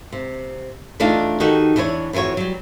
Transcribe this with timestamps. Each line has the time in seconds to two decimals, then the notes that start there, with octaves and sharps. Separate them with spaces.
0.12 C3
1.00 E2 A3 D4 D#4 F4 A5
1.40 D#3 D#4 F#4 G4 A4
1.76 E2 E3 D4 C5 C#5
2.13 F2 E3 F4 F#4 C#5
2.37 F#3 G3